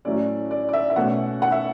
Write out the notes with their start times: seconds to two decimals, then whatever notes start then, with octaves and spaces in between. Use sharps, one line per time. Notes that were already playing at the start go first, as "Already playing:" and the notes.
0.05 A2 F#3 A3 C#4 D5
0.51 D5
0.69 D5
0.73 E5
0.90 E5
0.96 B2 A3 C#4 F#5
1.42 F#5
1.52 E5